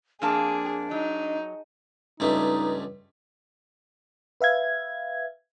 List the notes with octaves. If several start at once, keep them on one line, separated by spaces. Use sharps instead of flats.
F2 A#3 D4 G#4 A5
F#3 D#4
C#2 G2 A3 D#4
B4 E5 F5 G#6